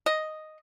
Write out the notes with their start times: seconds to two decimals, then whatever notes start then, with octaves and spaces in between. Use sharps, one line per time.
0.06 D#5